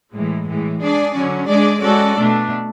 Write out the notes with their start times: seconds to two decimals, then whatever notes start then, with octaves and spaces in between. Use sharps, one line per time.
0.14 A2 E3 G#3
0.47 A2 E3 G#3
0.81 G#3 D4 G#4 D5
1.15 D3 F#3 C#4
1.48 G#3 D4 G#4 D5
1.82 G#3 C#4 F#4 A4 D5
2.16 B2 A3 D4